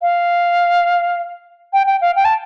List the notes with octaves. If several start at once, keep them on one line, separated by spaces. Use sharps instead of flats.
F5
G5
G5
F5
G5
A5